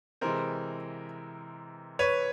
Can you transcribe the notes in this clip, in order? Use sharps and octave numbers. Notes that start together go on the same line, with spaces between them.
C3 E3 G#3 A#4 C5
B4 C#5